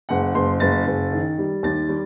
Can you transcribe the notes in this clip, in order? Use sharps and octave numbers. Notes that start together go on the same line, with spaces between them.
F#1 F#5
F#1 C6
F#1 A6
F#1
D#3
G3
D#2 A6
G3